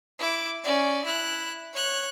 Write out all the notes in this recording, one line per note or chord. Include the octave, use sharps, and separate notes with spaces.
E4 D6
C#4 D5
E4 F#6
C#5 F#6